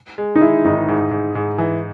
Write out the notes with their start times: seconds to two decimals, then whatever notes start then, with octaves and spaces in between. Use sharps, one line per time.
0.18 G#3
0.36 D#4
0.41 G#3 E4
0.65 G#1 D#4
0.88 G#2
1.11 G#2
1.35 G#2
1.58 E3